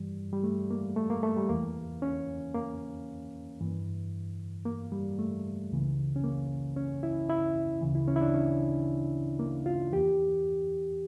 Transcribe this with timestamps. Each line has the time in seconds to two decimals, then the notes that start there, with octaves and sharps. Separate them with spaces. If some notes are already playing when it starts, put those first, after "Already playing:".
Already playing: G2 E3 G3
0.33 G3
0.44 A3
0.71 A#3
0.96 A3
1.10 A#3
1.23 A3
1.37 G3
1.49 E2 E3 A#3
2.02 C#4
2.55 A#3
3.60 G2 E3
4.65 A#3
4.92 G3
5.19 A3
5.71 C#2 C#3 E3
6.16 C#4
6.24 A#3
6.77 C#4
7.03 E4
7.29 E4
7.81 D2 C#3 E3
7.95 E4
8.08 C#4
8.16 E4
8.21 D4
8.35 C#4
9.39 A#3
9.66 F4
9.92 E2 E3 G4